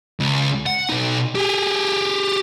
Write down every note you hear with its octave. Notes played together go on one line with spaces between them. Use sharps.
C#2
F#5
B2 D#4
G4 G#4